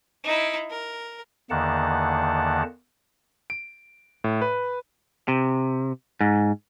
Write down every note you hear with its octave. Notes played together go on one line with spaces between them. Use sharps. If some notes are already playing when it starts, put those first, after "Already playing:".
D#4 E4
A#4
E2 D3 D#3 A#3 F#5 A5
D7
A2
B4
C3
G#2